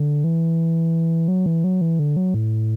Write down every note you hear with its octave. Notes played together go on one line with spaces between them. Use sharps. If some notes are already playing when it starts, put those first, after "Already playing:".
Already playing: D3
E3
F#3
E3
F#3
E3
D3
F#3
A2